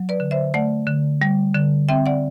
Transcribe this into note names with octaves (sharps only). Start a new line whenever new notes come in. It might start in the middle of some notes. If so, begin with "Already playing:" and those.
Already playing: F#3
B4 D5
D3
C5 E5
A3 D5 F#5
D3
G3
D3
C4 E5 G5
D5 F#5